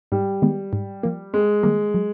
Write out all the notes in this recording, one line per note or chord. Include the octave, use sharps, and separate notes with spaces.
G#2 G3
D#3 G#3 B3
G#2
F3 A#3
G#2 G#3
D#3 G3 A#3
F#3